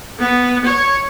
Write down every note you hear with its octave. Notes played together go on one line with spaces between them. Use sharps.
B3
C#5